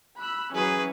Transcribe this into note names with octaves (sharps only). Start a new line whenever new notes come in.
B5 E6 F#6
E3 F#3 C#4 G#4 B4